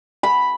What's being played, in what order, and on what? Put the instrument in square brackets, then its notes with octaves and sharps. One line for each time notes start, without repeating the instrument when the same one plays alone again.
[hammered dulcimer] B5